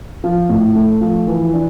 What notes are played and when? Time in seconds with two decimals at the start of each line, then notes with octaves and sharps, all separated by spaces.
0.24 F3
0.49 A2
0.75 A3
1.01 F3
1.27 E3
1.53 D4